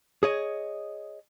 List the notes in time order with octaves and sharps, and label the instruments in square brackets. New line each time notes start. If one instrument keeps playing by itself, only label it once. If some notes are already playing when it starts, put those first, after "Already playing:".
[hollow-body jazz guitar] G#4 C#5 D#5